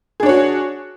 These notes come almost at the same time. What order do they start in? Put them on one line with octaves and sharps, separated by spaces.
G#4 D4 C#5 F#4